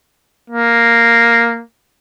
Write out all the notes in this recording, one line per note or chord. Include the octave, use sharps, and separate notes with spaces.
A#3